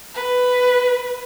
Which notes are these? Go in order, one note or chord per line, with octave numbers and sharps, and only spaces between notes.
B4